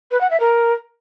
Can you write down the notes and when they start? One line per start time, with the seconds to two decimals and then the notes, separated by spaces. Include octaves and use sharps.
0.11 B4
0.21 F#5
0.30 E5
0.40 A#4